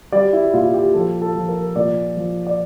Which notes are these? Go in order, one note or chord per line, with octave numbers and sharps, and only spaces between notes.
G3 D5
E4
A#2 F4
G4
F3 A4
A4
F3
A#4
A#2 D5
F3
D5